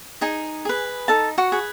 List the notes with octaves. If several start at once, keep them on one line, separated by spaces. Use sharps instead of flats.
D#4 G#4 G#5
G#4 B4
D#4 A4 A5
F#4 F#5
G#4 B4